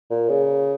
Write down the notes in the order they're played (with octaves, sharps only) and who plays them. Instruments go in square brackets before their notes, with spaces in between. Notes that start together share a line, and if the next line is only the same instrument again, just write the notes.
[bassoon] A#2
C#3